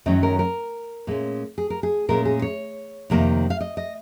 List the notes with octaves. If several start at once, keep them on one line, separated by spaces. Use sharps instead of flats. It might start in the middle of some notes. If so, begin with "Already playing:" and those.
F#2 D#3 F#3 C#4 D#5
A#4
A#4
A#2 G#3 C#4
G#4
A#4
G#4
A#2 G#3 C#4 A#4
G#4
C#5
F2 C3 D#3 A#3
F5
D#5
D#5